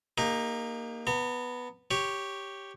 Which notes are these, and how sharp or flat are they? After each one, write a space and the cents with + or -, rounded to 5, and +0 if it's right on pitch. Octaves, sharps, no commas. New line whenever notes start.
A#3 +0 D#4 +0 G4 +45
B3 +0 A#5 -40
G4 +0 C#5 +0